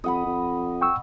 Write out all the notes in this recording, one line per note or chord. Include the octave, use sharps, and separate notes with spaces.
F2 D#5 F#5 B5
F2
G5 C#6 E6